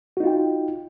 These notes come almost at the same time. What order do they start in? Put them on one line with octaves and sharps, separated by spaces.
F#4 D#4 F4 G5